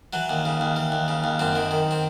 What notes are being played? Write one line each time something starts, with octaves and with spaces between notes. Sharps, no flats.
E3 F#3
D#2
C#3
D#2
E3
D#2
C#3
D#2
F#2 C4
D#3
D#3
C4